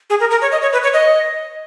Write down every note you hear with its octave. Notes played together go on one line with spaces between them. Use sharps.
G#4
A#4
A#4
C#5
D#5
C#5
B4
C#5
D#5